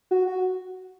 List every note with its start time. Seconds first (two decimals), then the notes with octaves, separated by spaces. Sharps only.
0.11 F#4
0.27 F#4